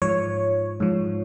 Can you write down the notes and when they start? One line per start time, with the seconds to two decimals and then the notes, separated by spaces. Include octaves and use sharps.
0.02 G#2 F3 C#5
0.80 G#2 F3